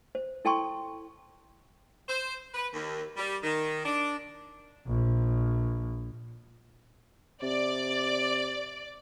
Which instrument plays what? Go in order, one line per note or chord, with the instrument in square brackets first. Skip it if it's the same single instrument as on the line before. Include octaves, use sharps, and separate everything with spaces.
[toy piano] C5
E4 A4 G5 A5 C6 C#6
[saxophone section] C5
B4
D#2
G3
D#3
D4
[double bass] A#1
[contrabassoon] C3 [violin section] D5